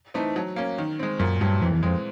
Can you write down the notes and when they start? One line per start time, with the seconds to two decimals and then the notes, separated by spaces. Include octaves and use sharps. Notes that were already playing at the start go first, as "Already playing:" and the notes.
0.14 E3 A3 C4 D#4
0.36 F#3
0.56 A#3 C#4
0.78 D#3
0.99 G#3 C4
1.20 F#2 A#2
1.41 G2 F#3 A3
1.62 F2 E3
1.73 E2
1.83 F2 G#3 C4